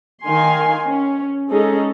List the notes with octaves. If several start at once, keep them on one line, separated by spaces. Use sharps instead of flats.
D#3 F5 G#5 C6
C#4
G#3 C#4 D#4 G#4 A4